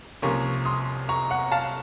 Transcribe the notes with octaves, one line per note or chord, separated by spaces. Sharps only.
C2 C3 F3 A#3 C#4 A#5 C#6
C6 D#6
A#5 C#6
F#5 A#5
F5 A5